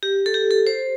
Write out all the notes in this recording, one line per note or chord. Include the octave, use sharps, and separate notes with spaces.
G4
A4
G4
A4
C5